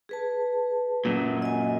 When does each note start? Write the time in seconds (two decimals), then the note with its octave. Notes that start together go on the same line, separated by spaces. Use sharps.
0.09 G#4 B4 A5
1.05 F#2 A#2
1.42 D#5 G#5